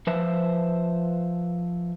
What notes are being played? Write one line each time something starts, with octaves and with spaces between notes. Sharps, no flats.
F3 B4 C5 E5